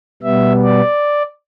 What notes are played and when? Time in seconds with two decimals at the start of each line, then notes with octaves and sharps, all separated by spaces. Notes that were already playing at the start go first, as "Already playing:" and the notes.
0.22 B2 G3 B3 E5
0.64 D5